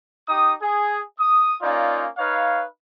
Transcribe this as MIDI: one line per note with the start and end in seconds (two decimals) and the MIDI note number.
0.28 0.53 63
0.28 0.53 67
0.28 0.53 87
0.62 1.00 68
1.18 1.55 87
1.62 2.06 58
1.62 2.06 61
1.62 2.06 63
1.62 2.06 65
1.62 2.06 74
2.18 2.64 63
2.18 2.64 71
2.18 2.64 73
2.18 2.64 77